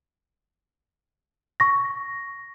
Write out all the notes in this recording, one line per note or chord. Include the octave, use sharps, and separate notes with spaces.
C#6 A#6